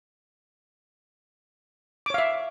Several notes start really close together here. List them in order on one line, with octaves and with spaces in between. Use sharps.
D6 C#5 F5 E5